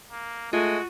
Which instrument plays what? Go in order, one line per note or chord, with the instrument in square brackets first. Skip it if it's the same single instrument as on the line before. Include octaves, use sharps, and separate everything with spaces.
[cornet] A#3
[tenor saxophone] G#3 [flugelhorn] A3 [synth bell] F4 [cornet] F#4